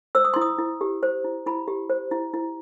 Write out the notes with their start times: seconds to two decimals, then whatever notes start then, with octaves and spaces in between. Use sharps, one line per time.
0.15 C5 E6
0.25 D#6
0.34 E4 C6
0.41 D#6
0.59 E4
0.81 G4
1.03 C5
1.24 E4
1.46 E4 B5
1.68 G4
1.89 C5
2.11 E4
2.34 E4